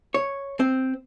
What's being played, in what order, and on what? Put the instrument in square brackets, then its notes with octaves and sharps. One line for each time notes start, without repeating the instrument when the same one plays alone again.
[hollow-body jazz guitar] C#5
C4